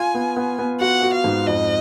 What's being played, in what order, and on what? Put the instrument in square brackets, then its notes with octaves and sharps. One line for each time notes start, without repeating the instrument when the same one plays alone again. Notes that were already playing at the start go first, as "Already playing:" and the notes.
Already playing: [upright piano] F4 [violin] G#5
[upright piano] B3
B3
B3
[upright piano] F#4 [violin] F#5
[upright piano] F#4
[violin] F5
[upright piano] G#2
[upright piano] F2 [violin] D#5